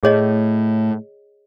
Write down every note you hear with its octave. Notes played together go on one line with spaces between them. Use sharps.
A2 G#4 C#5 D#5